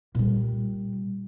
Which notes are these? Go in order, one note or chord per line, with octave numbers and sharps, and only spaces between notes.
A#2 G3